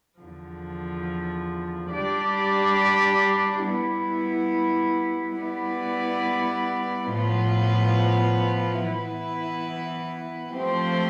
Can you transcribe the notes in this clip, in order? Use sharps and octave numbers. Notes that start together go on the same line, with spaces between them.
E2 D3 F3
G3 D4 G4 D5
G3 B3 E4
G3 B3 E4 B4 D5
A2 F3 B3 F4 B4
E3 B3 E4 B4
F3 A3 C4 G4 C5